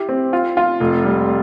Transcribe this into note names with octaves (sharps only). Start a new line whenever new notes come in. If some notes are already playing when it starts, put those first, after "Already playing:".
Already playing: E4 G4
C4
F4
F4
F1
G3